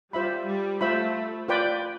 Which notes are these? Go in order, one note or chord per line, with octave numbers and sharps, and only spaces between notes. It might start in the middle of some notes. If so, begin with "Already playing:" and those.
G3 F4 C5 E5 B5
G3
A3 F4 C5 E5 B5
F4 B4 D5 G5